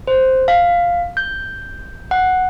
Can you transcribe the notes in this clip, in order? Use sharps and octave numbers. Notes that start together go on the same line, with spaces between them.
C5
F5
G6
F#5